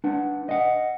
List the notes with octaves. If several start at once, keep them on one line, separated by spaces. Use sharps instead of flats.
D4 B4 F#5
D#5 F#5